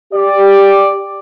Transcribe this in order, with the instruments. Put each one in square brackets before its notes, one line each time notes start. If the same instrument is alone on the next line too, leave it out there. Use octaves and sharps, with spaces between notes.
[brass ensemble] G4 D5